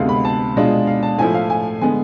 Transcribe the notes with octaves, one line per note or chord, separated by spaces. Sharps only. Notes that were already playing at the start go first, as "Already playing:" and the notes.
Already playing: D2 C3 G#3 B3 F5
B5
A5
B2 G#3 D4 F4
F5
A5
A2 F3 A3 E4 G#5
F5
G#5
D3 G#3 B3 G#5